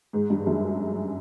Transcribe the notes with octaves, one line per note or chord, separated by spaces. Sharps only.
G#2
G2
F#2